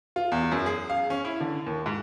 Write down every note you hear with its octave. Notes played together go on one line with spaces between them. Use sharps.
F4
E2
F#2
G#4
F5
C#4
E4
D3
D#2
G#2